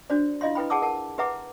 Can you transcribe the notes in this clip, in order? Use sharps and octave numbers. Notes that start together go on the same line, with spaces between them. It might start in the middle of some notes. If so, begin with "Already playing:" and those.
D4 F#4 C5 D5
E4 F4 D#5 F5 C6
E4 B4 G5 B5
G#4 F#5 A5 D6 E6
A#4 F#5 A5
G4 B4 E5 F#5 A#5 D6